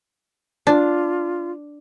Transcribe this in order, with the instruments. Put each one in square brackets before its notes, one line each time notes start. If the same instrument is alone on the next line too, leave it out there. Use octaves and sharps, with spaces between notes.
[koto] D4 [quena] F4